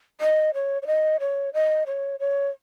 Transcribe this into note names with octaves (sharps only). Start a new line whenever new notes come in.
D#5
C#5
C#5
D#5
C#5
D#5
C#5
C#5